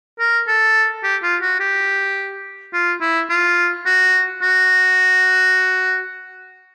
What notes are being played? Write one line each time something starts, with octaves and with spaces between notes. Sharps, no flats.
A#4
A4
G4
F4
F#4
G4
F4
E4
F4
F#4
F#4